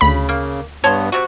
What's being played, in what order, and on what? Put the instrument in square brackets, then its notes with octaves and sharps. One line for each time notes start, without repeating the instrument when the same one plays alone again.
[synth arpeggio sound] D2 B5 [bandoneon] C#3
[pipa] A#3
[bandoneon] G2 B3 [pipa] C#5 A5 C6
[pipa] C3 F#4